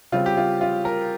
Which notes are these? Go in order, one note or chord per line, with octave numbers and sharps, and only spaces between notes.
C#3 G3 C4 F4
G4
F4
F4
A#4